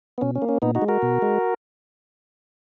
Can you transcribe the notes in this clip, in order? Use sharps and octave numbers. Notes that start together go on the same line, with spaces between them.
B3
B2 C#4
C#4
A#3
C#4
A#2 B3 D#4
D#4 F#4
G#3
F#4 A#4
B2
G#3